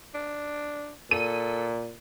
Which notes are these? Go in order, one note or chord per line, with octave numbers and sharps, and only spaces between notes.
D4
A#2 A4 D#7